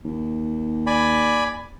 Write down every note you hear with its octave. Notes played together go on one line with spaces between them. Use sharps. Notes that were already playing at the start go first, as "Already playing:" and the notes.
D#2
D5 G#5 B5